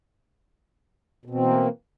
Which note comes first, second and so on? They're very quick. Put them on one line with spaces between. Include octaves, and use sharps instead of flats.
B2 C4 E3 A#3